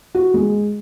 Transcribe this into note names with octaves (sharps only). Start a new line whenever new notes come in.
F#4
G#3